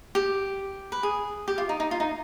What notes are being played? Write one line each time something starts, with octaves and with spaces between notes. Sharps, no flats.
G4
B4
G#4
G4
F4
D#4
D#4
F4
D#4